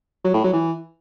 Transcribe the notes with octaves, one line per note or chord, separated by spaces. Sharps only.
F#3
A2
F#3
E3